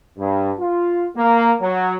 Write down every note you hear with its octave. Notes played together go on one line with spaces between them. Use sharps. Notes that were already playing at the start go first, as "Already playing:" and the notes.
G2
F4
A#3
F#3